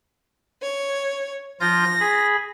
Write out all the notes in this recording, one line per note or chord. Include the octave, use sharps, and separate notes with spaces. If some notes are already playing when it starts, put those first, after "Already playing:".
C#5
F3 F4 G6 A#6
G#4 B5